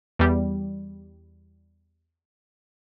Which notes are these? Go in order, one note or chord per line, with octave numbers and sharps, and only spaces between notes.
E2 G3